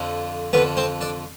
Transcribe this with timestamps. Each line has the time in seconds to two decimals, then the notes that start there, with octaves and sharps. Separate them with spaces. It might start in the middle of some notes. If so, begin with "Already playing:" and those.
Already playing: F2 D3 F3
0.53 F2 D3 F3 B3 B4
0.77 C4 C5
1.01 D4 D5